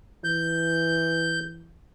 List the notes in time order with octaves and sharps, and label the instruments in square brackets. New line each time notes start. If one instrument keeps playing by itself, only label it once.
[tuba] E3 [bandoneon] G6